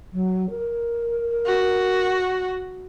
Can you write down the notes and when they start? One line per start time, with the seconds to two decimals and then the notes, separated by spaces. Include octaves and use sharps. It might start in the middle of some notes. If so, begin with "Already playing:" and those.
0.13 F#3
0.50 A#4
1.47 F#4